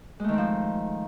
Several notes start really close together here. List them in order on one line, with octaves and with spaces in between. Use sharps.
G#3 A3 D#3 C4 F3